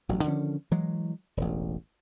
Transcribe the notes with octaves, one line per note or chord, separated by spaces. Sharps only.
A1 G2 F#3
D3 D#3 F3 C#4
E3 F#3 G#3
E1 A1